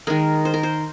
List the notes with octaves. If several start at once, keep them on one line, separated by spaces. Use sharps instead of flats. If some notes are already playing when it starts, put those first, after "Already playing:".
D#3 G#3 A#4
C5
A#4
C5